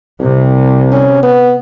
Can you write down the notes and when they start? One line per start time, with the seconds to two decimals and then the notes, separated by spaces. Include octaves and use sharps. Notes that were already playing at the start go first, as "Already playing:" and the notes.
0.20 C2 C3
0.92 C#4
1.23 B3